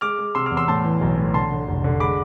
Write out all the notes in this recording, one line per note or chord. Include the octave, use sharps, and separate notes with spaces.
G#3 D6 F6
G#3
C3 C6 E6
D6 F6
E2
C6 E6
A2 A5 C6
E3
B1
A2
D3 A5 C6
D3
F1
D3
G#3 B5 D6